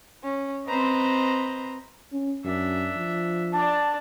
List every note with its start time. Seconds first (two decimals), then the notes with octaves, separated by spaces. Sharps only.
0.23 C#4
0.68 C4 B4 C5 D#5 A#5
2.12 C#4
2.45 F#2 D4 E5
2.96 F3
3.53 D4 D5 A5